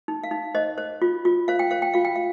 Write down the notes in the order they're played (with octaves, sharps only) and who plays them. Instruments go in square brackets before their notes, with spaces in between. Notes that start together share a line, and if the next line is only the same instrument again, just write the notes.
[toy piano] D#4
F5
D#4
C5 D#5
C5
F4
F4
C5 F5
G5
C5 F5
G5
F4 F5
G5
F5